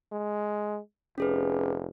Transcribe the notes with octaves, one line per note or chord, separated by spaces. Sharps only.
G#3
F1 C#4 G#4 B4